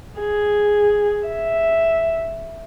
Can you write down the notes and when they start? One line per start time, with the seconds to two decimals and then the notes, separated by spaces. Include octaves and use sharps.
0.20 G#4
1.28 E5